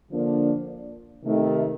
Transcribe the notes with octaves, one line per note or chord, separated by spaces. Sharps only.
D3 F3 A#3 D4
C3 D#3 A3